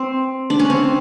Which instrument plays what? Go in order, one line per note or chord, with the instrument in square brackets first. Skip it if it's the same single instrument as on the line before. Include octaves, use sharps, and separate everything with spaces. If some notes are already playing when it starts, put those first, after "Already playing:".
Already playing: [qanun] C4
D4
C#4
C4